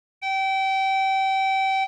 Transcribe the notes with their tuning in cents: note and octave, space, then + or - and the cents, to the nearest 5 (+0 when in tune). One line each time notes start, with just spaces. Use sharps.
G5 -30